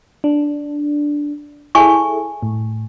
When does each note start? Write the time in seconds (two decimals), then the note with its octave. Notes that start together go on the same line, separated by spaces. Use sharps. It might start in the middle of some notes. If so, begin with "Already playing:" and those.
0.24 D4
1.75 E4 G#4 A4 G#5 C#6
2.43 A2